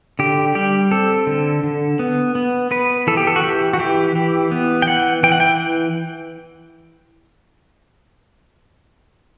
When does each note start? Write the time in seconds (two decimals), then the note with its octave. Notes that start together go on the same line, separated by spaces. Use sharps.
0.19 D3 G4
0.55 G3 G4
0.91 C4 A4
1.27 D3
1.64 D3
1.99 B3
2.35 B3
2.71 B3 B4
3.07 E3 A4
3.17 G4
3.27 A4
3.36 F#4
3.44 E3 G4
3.73 F#4
3.79 E3 G4
4.15 E3
4.51 B3
4.82 G5
4.87 E3 F#5
5.23 E3 G5
5.32 F#5
5.40 G5